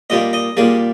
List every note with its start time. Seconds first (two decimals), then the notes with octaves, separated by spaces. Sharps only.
0.10 A#2 G3 A#3 D#5
0.33 D#5
0.57 A#2 G3 A#3 G#4